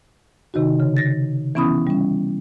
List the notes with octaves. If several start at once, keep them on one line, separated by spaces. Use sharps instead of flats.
C3 D#3 D#4 F#4
C#3
A6 A#6
E3 B3 C#4 E4 B5 D#6
G3 C#4